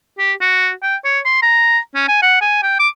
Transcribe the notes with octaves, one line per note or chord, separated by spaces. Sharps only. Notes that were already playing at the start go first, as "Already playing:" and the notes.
G4
F#4
G5
C#5
C6
A#5
C#4
G#5
F#5
G#5
G5
D6